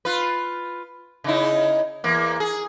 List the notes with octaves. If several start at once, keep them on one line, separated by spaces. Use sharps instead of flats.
F4 B4
C#3 D#4 E4
E2 A#3
G#4